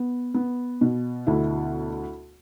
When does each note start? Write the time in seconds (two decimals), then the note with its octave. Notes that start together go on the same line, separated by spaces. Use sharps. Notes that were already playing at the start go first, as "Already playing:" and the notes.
Already playing: B3
0.34 B3
0.81 B2
1.27 D2 E4